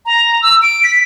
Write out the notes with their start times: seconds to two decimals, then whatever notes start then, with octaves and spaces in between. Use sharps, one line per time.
0.06 A#5
0.42 E6
0.62 D7
0.84 B6